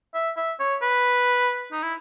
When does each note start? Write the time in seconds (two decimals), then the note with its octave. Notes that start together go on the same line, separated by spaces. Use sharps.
0.14 E5
0.37 E5
0.59 C#5
0.82 B4
1.72 D#4
1.83 E4